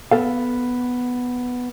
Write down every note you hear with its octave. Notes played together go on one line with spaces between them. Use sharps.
B3 A4 F5